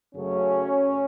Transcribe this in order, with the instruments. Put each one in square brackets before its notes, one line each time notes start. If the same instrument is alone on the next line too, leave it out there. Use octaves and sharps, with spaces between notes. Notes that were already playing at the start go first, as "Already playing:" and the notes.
[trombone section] F#2 C#3 F#3 A3 C#4